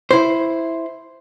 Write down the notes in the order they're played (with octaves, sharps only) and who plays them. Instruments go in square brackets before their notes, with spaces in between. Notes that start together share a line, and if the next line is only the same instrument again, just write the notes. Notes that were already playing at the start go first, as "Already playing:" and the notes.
[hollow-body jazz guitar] E4 C5